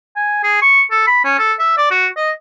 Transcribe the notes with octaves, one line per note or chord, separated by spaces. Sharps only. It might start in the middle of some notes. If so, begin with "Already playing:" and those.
G#5
G#4
C#6
A4
B5
C#4
A4
E5
D5
F#4
D#5